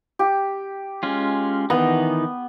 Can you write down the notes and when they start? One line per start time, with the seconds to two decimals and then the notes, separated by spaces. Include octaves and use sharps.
0.19 G4
1.03 G#3 C#4 F4
1.70 D#3 E3 B3 D#4